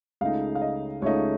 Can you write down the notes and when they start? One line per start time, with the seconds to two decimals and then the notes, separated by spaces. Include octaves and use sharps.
0.21 C#2 C#3 A3 D#4 F5
0.55 F5
0.62 D#5
1.02 C#2 C#3 A3 D#4 C#5